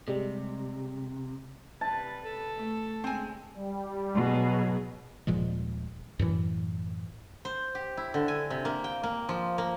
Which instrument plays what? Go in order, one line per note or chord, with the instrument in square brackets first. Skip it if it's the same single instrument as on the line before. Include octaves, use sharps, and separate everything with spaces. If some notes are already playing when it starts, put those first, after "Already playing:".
[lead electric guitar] C3 [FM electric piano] G3 G#3
[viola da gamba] C3 G3 B4 [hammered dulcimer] A5
[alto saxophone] A4
[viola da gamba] A3
[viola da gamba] C#3 G#3 [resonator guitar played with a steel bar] C4 G#5
[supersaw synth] G3
[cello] B2 G#4 [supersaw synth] F#3
[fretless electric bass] D#1 A#2 F3 G#3
F#2 A2 E3
[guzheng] C5
G4
E4
D3
G#5
C3
A#3
G5
A#3
F3
A#3